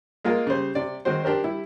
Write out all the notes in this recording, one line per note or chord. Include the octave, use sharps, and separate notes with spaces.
G#3 A#3 F4 G#4 A#4
C#3 G3 C5
C3 D5
D#3 G#3 C4 F#4 C5
D4 G4 A#4 C5
G3 E4